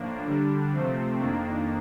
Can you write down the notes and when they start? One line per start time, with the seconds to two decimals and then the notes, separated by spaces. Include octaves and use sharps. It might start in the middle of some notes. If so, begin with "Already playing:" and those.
Already playing: A2 F3 A#3 D4
0.25 D3 G3 D4
0.72 C3 F3 A3 C4
1.19 F2 D#3 A#3 D4